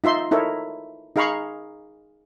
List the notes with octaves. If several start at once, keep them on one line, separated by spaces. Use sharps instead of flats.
D#4 F4 E5 C6
D#4 E4 A4 A#4 C#5
D#4 G#4 F5 A#5 B5 C#6